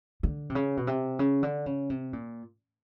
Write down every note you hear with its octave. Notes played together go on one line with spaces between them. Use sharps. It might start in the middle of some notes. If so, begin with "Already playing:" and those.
D3
C3
C#3
B2
C3
C#3
D3
C#3
C3
A#2